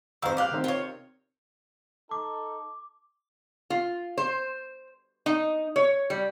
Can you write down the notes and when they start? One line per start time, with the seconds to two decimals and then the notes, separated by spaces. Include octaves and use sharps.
0.22 F2 D#3 C5 F5 E6
0.37 G4 F5 D6 F#6
0.52 C3 D#3 C4
0.64 F4 C#5
2.11 D#4 A4 D6
3.70 F4
4.18 C5
5.26 D#4
5.76 C#5
6.10 G3